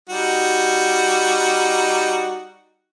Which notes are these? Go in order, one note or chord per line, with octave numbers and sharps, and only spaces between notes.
G3 D#4 F#4